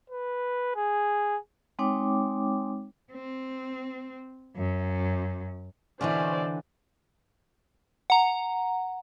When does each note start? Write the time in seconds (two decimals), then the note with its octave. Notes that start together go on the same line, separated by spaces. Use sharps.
0.10 B4
0.76 G#4
1.79 G#3 C4 D#4 C#5 G5 D6
3.13 C4
4.56 F#2
6.01 B2 D3 E3 C4 C#4 C5 D5
8.10 F#5 A#5